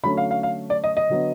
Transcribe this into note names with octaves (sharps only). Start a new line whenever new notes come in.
D3 F#3 A3 C#4 B5
F5
F5
F5
D5
D#5
D#5
D3 F#3 B3